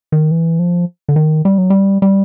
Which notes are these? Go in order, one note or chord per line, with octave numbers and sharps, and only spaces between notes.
D#3
E3
F3
D3
D#3
G3
F#3
G3
G3